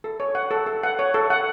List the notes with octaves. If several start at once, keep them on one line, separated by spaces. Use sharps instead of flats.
A4
C#5
F#5
A4
A4
F#5
C#5
A4
F#5